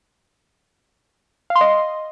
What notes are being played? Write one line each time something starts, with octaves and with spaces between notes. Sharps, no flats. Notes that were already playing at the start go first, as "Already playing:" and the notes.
F5
C6
D#5